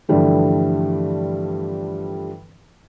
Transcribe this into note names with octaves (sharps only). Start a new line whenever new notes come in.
G2 D3 E3 F3 G3 A3